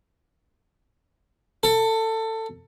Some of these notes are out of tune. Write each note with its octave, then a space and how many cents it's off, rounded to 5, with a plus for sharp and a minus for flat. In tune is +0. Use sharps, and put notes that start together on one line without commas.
A4 +20